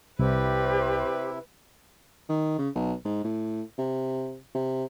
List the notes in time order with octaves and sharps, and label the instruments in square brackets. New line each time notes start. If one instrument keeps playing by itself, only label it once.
[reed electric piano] C2 [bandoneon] C3 E4 [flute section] G4 C5 D5 [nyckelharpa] B4
[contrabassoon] D#3
C#3
B1
G#2
A2
C3
C3